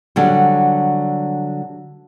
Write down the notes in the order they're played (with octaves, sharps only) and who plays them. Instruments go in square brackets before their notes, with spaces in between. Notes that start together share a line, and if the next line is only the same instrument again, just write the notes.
[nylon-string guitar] D3 F#3 G3